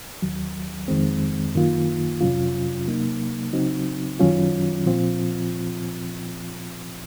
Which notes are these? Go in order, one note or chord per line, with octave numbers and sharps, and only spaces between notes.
D#2 D#3 F#3
F2 D#3 G#3 C4
F#2 D#3 A#3 F4
F2 C3 F#3 C#4 F4
C3 F#3 A#3 D#4
C#3 F#3 C4 D#4 F#4
F#2 D#3 F#3 C#4 F4
A#2 F3 C4 F4